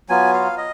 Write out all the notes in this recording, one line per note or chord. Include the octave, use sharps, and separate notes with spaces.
F#3 B3 F4 G#5
F5
D#5